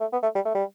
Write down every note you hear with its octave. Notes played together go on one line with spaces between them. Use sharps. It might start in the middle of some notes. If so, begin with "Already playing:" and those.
A3
B3
A3
G3
A3
G3